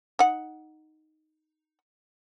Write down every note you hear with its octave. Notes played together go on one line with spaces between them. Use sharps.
D#4 F#5